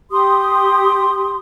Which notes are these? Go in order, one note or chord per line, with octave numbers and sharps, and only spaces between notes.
G4 C6 D#6